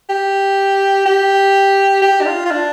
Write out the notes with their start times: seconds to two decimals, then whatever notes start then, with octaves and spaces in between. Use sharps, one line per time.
0.09 G4
1.06 G4
2.02 G4
2.21 D4
2.26 F4
2.45 F4
2.51 D4